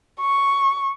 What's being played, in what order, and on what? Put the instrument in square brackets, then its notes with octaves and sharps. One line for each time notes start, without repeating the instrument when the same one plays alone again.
[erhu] C#6